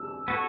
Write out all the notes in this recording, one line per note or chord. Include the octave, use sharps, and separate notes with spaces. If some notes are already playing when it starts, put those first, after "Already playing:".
Already playing: E6
B3 F#4 A4 C#5